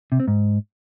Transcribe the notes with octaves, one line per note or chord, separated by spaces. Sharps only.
C3
C4
G#2